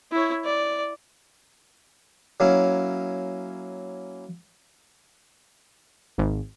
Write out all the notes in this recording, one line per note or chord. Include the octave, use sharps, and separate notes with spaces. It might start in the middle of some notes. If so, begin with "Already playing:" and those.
E4 C#5
D5
F#3 A#3 C#4 E4
G#1